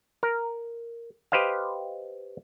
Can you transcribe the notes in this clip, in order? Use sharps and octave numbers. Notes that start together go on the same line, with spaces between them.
A#4
G4 B4 C5 D#5 F5